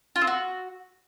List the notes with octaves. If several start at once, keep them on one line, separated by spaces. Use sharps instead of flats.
F4
C4
F#4